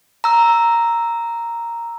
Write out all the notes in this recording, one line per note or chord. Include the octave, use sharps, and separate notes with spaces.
A#5 E6